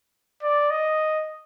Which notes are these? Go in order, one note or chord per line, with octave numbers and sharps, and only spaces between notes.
D5
D#5